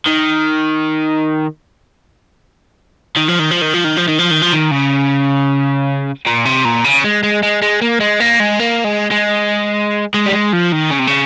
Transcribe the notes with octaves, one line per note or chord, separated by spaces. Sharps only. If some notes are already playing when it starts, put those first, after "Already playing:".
D#3
D#3
F3
D#3
F3
D#3
F3
D#3
F3
D#3
F3
D#3
F3
D#3
C#3
A#2
C3
A#2
C#3
G#3
G#3
G#3
G#3
A#3
G#3
A#3
G#3
A#3
G#3
G#3
G#3
G3
G#3
F3
D#3
C#3
C3
C#3